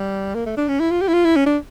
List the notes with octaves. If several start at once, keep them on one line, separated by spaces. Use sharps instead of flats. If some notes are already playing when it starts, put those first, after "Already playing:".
Already playing: G3
A#3
A3
D4
C#4
E4
F4
G4
E4
F4
E4
C#4
D4